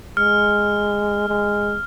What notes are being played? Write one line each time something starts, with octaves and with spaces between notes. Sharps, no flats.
G#3 F6
G#3